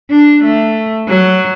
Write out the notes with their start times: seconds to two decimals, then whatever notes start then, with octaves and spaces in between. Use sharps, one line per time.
0.11 D4
0.44 A3
1.08 F#3